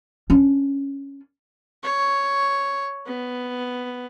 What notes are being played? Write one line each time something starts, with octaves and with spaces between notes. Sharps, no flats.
C#4 D4
C#5
B3